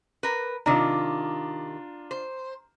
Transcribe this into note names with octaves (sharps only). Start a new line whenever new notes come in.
A#4 B4
C3 D#3 D4 F4 A#5
C5